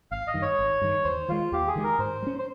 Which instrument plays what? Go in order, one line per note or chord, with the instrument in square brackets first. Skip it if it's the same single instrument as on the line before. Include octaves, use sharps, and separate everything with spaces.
[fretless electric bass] G#1 [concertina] F5
[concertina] D#5
[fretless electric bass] G2 D#3
[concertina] C#5
[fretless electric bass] G#1
G2 D#3
[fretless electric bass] D#2 [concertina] C5
[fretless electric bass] D#3 G#3 [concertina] F4
[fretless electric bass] D#2 [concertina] G4
[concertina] G#4
[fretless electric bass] D#3 G#3
[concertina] A#4
[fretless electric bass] G#2 [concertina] C5
[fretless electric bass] G3
C#4
[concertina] C5